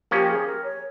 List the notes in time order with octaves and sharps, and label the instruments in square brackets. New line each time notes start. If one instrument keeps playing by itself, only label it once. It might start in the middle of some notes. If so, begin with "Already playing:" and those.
[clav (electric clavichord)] F3 A#3 C#4 [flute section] G4
[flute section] G#4
A#4
C#5